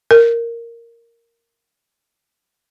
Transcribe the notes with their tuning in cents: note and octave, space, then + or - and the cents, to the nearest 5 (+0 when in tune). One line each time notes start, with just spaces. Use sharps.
A#4 -5